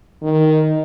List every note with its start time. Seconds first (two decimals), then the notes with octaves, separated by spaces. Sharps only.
0.23 D#3